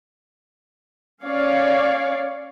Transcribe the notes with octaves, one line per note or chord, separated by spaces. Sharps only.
C#4 C#5 D5 F5